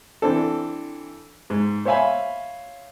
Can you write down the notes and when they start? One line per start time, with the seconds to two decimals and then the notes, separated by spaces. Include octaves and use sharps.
0.22 E3 C4 D4 A4
1.50 G#2
1.85 C5 C#5 E5 F5 G#5 B5